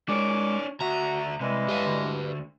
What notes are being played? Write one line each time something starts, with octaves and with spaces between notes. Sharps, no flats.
A#2 G#3 D4 C#5 C#6 D6
D2 F#4 E5 A#5
C2 C3 E3 G3 G#3
G4 B4 D#5 F5
D2 D3